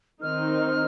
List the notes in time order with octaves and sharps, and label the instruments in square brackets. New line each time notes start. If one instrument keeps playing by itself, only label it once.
[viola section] D#3 C4 D#4 [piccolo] F6